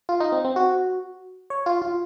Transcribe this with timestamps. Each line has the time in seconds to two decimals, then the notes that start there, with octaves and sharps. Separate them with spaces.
0.09 F4
0.20 D#4
0.32 C4
0.45 C4
0.56 F#4
1.50 C#5
1.66 F4
1.82 F4